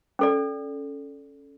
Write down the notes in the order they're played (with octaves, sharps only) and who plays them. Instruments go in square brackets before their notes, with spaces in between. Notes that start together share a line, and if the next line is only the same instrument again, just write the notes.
[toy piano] C#4 A4 D5